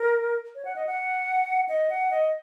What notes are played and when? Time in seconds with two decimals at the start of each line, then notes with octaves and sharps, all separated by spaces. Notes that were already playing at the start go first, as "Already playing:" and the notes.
Already playing: A#4
0.55 C#5
0.65 F#5
0.76 D#5
0.87 F#5
1.69 D#5
1.90 F#5
2.11 D#5